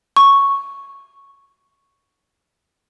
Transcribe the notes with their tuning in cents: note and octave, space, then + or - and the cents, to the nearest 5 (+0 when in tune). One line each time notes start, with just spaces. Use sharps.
C#6 +0